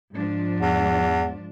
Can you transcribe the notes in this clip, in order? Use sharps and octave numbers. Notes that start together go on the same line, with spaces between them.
G#2 F3 D4
E2